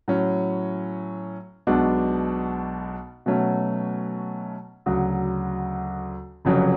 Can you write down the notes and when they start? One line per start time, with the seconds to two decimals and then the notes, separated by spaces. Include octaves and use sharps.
0.08 A2 F#3 C#4
1.67 B1 B2 G#3 D4
3.26 B2 F#3 A3 C#4
4.86 D2 C#3 F#3
6.45 F1 F2 C#3 F#3 C#4